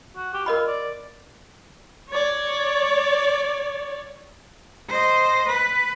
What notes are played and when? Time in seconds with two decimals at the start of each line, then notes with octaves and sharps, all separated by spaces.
0.17 F#4
0.34 G4
0.46 F4 A#4 D#5 B5
0.67 D5
2.10 C#5 D5
4.88 C5 D#5
5.47 B4